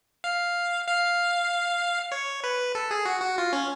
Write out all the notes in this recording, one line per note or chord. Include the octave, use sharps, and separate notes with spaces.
F5
F5
C#5
B4
A4
G#4
F#4
F#4
F4
C#4